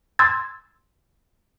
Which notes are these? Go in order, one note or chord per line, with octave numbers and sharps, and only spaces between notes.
C6 E6 G#6 A6